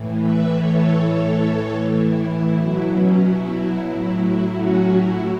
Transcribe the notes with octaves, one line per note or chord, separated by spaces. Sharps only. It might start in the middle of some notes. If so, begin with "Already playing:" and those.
Already playing: A2 E3
B4 E5
A4 C#5
A2 E3
E4
E4
B2 F#3 E4
C#4
E4
A2 F#3 E4
E4
C#4 F#4
E4